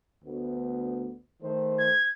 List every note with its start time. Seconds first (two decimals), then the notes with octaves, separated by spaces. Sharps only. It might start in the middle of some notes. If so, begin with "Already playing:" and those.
0.23 D2 B3
1.42 D#3 A3 C5
1.79 G#6